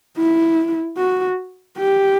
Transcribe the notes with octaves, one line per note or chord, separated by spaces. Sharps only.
E4
F#4
G4